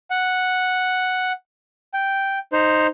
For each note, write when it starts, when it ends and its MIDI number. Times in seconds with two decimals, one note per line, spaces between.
0.11 1.32 78
1.94 2.39 79
2.53 2.87 63
2.53 2.87 72